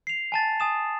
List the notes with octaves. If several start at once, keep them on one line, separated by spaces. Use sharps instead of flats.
C7 F7
G#5 A5 A6
G#5 D#6 E7